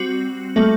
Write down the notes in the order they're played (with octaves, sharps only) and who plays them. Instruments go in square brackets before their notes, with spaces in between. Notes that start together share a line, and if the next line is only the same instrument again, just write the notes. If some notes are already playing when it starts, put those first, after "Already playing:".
Already playing: [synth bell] G3 C4 F#4
[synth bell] G3 A#3 F#4 [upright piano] A3